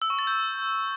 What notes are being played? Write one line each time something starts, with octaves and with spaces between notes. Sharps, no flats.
E6
C#6
A6
G6